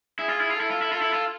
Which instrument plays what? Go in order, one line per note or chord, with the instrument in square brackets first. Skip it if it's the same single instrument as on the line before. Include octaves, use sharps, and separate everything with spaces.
[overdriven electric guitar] E4 [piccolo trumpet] G#4
[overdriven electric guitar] F4
E4
F4
[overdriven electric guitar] E4 [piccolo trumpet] A4
[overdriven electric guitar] F4
E4
[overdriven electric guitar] F4 [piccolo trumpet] A4
[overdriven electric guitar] E4
F4